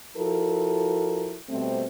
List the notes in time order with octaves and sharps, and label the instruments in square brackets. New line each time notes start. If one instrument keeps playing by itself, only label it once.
[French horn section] F3 E4 F#4 A4 A#4
B2 G3 A3 C4